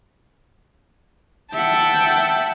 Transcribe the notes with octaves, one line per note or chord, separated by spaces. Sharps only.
E5 F#5 G5 A5